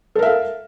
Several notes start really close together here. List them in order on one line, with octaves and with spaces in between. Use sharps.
A4 A#4 E5 F5